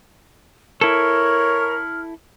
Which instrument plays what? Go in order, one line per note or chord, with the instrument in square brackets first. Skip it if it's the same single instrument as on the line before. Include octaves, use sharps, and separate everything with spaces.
[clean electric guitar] E4 A4 [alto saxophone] A#4 [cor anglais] C#5 [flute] F6